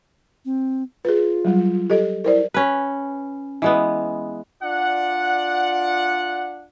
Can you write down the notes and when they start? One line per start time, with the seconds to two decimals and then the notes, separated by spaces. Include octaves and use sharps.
0.45 C4
1.05 F4 G#4 B4
1.45 F#3 G3
1.90 G4 A4 D#5
2.24 E4 A#4 C5 D5
2.54 C#4 B4
3.62 E3 G#3 B3
4.63 D4 F4 D5 F#5